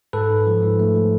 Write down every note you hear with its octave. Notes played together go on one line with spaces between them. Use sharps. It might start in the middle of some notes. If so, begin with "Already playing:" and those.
G#2 A4 B4
G#2
F3
G#2
A3
F3